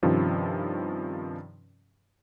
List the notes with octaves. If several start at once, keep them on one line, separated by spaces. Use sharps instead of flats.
G2 C3 D#3 F3 C#4